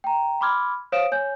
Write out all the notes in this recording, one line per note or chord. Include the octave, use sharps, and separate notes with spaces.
G5 A#5
B5 C6 D6 F6 G#6
C5 C#5 F5 D#6 D7 E7
C#5 G#5 G6